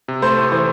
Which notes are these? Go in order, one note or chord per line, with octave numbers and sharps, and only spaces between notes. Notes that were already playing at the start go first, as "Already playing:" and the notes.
C3
A3 C5
A2
E3 C5